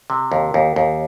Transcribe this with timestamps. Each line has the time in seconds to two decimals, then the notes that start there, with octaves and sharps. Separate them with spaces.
0.10 C3
0.32 D#2
0.54 D#2
0.76 D#2